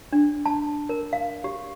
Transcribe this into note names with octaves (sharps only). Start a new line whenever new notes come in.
D4
A5
A#4
F5
G4